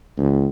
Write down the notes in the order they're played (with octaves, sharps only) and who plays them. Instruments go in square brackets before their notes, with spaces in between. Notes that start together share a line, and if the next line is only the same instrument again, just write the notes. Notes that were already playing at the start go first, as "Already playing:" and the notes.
[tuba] C#2